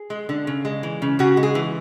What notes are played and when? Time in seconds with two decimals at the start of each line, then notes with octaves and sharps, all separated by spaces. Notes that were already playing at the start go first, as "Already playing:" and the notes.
Already playing: G#4
0.10 G#3
0.29 D3
0.47 C#3
0.65 G#3
0.83 E3
1.02 C#3
1.19 C#3 F#4
1.37 G#3
1.43 G#4
1.55 E3